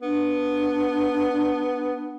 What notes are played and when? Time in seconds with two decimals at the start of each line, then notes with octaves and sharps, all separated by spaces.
0.02 B3 D4